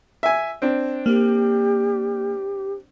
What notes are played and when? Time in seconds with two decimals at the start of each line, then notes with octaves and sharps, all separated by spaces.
0.23 E5 G#5
0.62 C4 D4
1.06 A#3 G4